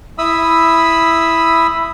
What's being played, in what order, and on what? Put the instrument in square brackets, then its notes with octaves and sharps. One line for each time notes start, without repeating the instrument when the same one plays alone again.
[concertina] E4 E5 B5 D#6 E6